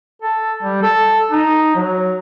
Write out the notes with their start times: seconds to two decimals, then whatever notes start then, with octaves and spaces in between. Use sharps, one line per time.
0.22 A4
0.63 G3
0.82 A4
1.31 D#4
1.75 F#3